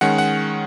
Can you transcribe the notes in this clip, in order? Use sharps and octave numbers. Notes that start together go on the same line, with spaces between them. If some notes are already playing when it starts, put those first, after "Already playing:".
D#3 G#3 C#4 F#5
F#5